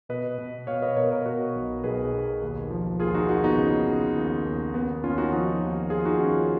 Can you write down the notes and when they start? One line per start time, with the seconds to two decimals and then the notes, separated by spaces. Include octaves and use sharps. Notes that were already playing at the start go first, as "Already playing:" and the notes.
0.09 B2 B4 D#5
0.38 B2
0.67 B2 C#5 F5
0.82 B4 D#5
0.96 B2 A#4 C#5
1.11 A#4 C#5
1.25 B2 F#4 A#4
1.55 B1
1.84 B1 G#4 B4
2.13 B2
2.42 D#2
2.71 F3
3.00 D#2 F4 G#4
3.14 D#4 F#4
3.29 D#2 D#4 F#4
3.43 B3 D#4
3.58 C#3
3.88 C#3
4.17 D#2
4.45 D#2
4.74 D#2 B3
5.03 D#2 C#4 F4
5.18 D#4 F#4
5.32 F3 D#4 F#4
5.62 D#2
5.90 F3 F4 G#4
6.05 D#4 F#4
6.19 D#2 C#4 F4